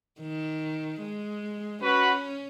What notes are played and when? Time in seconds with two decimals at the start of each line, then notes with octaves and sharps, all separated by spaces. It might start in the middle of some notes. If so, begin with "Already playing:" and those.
0.20 D#3
1.01 G#3
1.82 C#4 F#4 B4